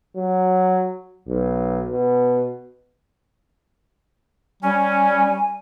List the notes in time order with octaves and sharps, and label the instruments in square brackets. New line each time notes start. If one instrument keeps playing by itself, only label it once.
[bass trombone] F#3
B1
B2
[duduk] G3 [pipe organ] C#4 [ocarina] G#5